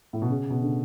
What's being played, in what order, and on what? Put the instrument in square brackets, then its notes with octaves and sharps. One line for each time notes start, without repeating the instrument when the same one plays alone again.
[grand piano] A2
B2
C#3
B2
D3